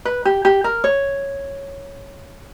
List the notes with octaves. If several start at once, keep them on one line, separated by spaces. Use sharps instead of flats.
B4
G4
G4
A#4
C#5